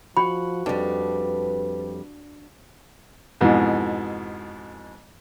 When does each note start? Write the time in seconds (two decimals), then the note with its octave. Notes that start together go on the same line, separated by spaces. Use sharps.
0.17 F3 F#4 F#5 B5
0.66 F2 G3 D4 B4
3.41 F2 G#2 B2 E3